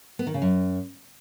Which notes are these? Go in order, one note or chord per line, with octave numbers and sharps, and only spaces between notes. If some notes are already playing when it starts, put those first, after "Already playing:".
B3
D#3
C#3
F#2